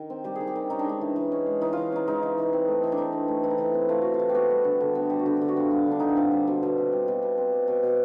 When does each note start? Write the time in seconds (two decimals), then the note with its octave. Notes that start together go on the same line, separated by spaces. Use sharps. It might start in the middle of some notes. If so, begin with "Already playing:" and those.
Already playing: D#3
0.10 C4
0.24 G3 G4
0.35 D#3 G#4
0.47 G4
0.55 D#3
0.70 C#4 D#4
0.79 D4
0.85 G#3 D#4
1.01 E3
1.16 E3
1.32 C#4
1.46 G#3
1.61 E3 D#4
1.73 E3 F4
1.92 C#4 D#4
2.07 G#3 D#4
2.23 E3
2.38 E3
2.53 C4
2.68 A3
2.83 E3
2.92 D4
2.97 E3 D#4
3.13 C4
3.28 A3
3.43 E3 E4
3.50 D#4
3.58 E3 E4
3.74 C4
3.89 A3 F4
4.02 E3 F#4
4.14 F4
4.19 E3
4.29 G4
4.34 B3 F#4
4.50 G3
4.64 D3
4.80 D3
4.95 B3
5.10 G3
5.19 F#4
5.26 D3 G4
5.37 D3 G4
5.48 F#4
5.56 B3 F4
5.70 G3 F4
5.86 D3
5.91 D4
5.99 D3 D#4
6.09 E4
6.16 C4 F4
6.32 G3
6.47 B2
6.63 B2
6.78 C4
6.92 G3
7.08 B2
7.22 B2
7.37 C4
7.52 G3
7.68 B2
7.83 B2